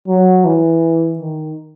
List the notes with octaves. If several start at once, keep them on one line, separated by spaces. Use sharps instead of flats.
F#3
E3
D#3